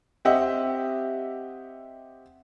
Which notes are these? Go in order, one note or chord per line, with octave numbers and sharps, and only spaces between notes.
C4 G4 D#5 E5 F#5